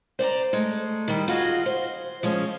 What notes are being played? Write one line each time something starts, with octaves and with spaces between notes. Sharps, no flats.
C5 D5 G5 A#5
G#3 A3
D#3 G3
F4 F#4 G#4 D#5
C5
F3 G#3 C#4